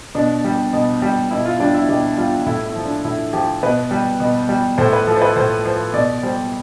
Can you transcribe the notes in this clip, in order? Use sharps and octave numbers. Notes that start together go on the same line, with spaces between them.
B2 D4
G3
B2
G3
B2 E4
F4
G3 D4
E4
B2 G4
G3 F4
A2 E4
E4
F3
D4
A2 E4
F3 G4
B2 B4
G3
B2
G3
A2 C5
B4
F3 A4
C5
B4
A2 C5
F3 C5
B2 D5
G3 C5